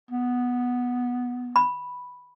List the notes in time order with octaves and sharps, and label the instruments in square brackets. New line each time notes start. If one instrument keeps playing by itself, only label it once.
[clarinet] B3
[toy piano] B5